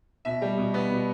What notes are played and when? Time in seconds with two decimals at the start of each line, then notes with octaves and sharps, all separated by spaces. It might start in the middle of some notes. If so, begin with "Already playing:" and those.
0.25 B2 E5
0.42 G3
0.58 B2
0.74 B3
0.90 B2